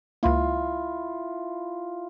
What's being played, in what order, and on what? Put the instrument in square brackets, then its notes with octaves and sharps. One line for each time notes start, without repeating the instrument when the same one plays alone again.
[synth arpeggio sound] C#2 A#3 [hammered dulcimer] E4 F4